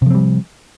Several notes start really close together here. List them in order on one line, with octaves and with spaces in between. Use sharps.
C3 F3 C4 G3